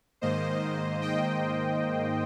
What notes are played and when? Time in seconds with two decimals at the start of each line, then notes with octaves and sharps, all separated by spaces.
0.21 G#2 D#3 A#3 C5 D#5
1.01 D#5 G5